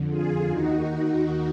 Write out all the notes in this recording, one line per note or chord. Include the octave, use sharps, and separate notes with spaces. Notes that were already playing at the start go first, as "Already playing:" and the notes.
Already playing: F2 D3
F4 G#4
D#2 D#3 D#4 F#4